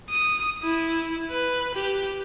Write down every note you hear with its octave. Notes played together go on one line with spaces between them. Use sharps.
D#6
E4
B4
G4